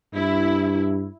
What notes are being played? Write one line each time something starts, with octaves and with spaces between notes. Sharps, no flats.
G2 E4